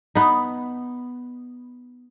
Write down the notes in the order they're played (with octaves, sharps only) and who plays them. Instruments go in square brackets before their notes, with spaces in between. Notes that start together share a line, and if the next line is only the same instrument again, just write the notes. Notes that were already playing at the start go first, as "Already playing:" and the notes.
[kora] B3 D#4